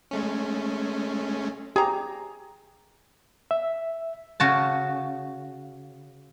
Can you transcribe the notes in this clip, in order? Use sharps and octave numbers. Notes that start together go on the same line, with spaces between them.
G#3 A3 C#4
G4 G#4 A#5
E5
C#3 F#4 A5